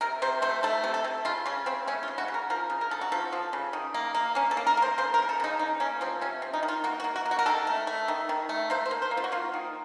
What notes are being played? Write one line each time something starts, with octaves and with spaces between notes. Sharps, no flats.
C3 A#4
C3 C5
A3 C5
A3 A4
C3
A4
C3
C#3 F4
C#3 C#4
C#3 C4
A3 C#4
F4
C#3
F#4
C#3
A#4
F3 A#4
C#3
A#4
C#3 A4
F#4
F3 A4
F3
C#3
D#3
A#3
A#3
A#3 C#4
A4
A#3
A#4
A#3 C5
C#3 C5
A#4
C#3
A4
C#3 D#4
A#3 D#4
A#3 C#4
F3 C4
C3 C#4
C3
D#4
D#3
F4
A#3 F#4
F#4
A#3
F#4
A#3
F#4
A#4
D#3 A4
A3
A3
D#3
D#3
A3
A#3 C5
C5
A#3
C5
A#3
F4
F#4
A#3 F4
D#3